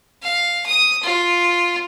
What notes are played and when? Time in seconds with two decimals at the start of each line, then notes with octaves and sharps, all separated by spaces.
0.22 F5
0.66 D#6
1.03 F4